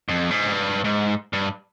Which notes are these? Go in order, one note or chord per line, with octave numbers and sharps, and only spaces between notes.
F2
G#2
G2
G#2
G2